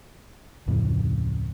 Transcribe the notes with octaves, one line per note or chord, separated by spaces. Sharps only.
D1 F2 A2 C#3